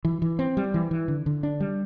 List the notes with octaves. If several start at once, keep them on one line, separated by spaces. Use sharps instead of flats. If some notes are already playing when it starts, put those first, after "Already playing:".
E3
E3
C4
G3
E3
E3
D3
D3
D4
G3